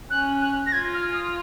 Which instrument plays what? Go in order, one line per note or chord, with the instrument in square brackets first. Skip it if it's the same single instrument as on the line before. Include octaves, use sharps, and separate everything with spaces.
[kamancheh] C#4 [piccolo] F#6
[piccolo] F#6
A#6
[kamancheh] F4 [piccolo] G#6
[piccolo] F6
D#6